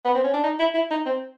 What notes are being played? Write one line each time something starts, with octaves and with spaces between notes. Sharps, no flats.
B3
C4
C#4
D4
D#4
E4
E4
D#4
C4